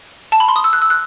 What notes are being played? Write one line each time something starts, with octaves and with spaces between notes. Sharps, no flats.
A5
B5
C6
D#6
E6
F#6
E6
F#6